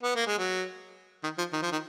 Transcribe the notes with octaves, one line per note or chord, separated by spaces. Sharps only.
B3
A#3
G#3
F#3
D#3
F3
D#3
F3
D#3